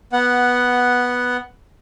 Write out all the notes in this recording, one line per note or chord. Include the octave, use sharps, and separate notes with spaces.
B3 F#5